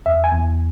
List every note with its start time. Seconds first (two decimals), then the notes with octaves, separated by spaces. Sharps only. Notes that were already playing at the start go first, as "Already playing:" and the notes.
0.06 E2 E5
0.24 G#5
0.32 E2